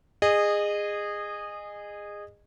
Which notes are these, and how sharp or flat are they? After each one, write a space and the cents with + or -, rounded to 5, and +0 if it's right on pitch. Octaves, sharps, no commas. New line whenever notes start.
G#4 -15 D#5 -25